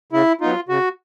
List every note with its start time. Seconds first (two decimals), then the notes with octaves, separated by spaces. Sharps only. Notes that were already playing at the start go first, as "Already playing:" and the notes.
0.12 C#3 E4
0.41 F#3 B3 D#4 F4
0.69 C#3 F#4